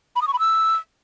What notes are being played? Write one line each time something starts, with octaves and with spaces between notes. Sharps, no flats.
B5
D#6
C#6
B5
E6